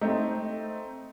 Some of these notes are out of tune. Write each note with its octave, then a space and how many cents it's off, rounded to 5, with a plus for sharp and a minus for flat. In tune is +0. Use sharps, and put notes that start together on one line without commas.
A3 +10 C4 +0 D#4 +0